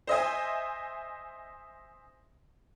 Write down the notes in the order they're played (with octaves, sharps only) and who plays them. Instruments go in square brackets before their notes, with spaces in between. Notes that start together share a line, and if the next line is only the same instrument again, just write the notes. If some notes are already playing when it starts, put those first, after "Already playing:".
[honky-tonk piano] C5 D#5 E5 G#5